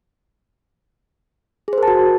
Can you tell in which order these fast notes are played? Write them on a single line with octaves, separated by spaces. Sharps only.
G#4 C5 A#4 A5 F#4